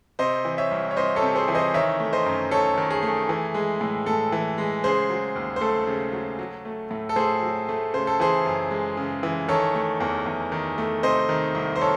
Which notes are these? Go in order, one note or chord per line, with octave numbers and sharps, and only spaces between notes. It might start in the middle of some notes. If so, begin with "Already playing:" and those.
C3 C5 D#5
E3
C#5 E5
C2
C#5
C2 C5 D#5
A4 C#5
C3
G#4 C5
E3
C5 D#5
D#3 C#5 E5
A3
C5 D#5
F#2
F#2 A4 C#5
D#3
G#4
A3
E3
G#3
A2
A2 A4
E3
G#3
C#3 G#4 C5
F#3
D#2
C5
A3 A4
C#3
F#3
F#3
A3
A2
A4
A2 G#4 C5
F#3
A3
C#3 C5
A4
E3 G#4 C5
F#2
G#3
C#3
E3
D#3 A4 C#5
A3
E2
E2
D#3
A3
C3 C5 D#5
D#3
C2
C5
A4 C#5